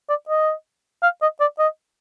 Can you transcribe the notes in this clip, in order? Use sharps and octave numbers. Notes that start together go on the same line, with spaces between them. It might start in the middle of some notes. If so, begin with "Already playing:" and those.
D5
D#5
F5
D#5
D5
D#5